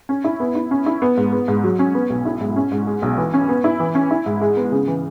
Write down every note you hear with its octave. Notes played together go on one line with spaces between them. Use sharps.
C#4
E4
B3
E4
C#4
E4
B3
G#2
B3
G#2
F#3
C#4
B3
B1
E4
G#2
C#4
G#2
G#3
B1
E3
C#4
B3
E4
E3
C#4
E4
G#2
G#3
B3
C#3
E3